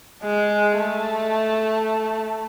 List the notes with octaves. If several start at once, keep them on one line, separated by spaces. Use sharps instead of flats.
G#3
A3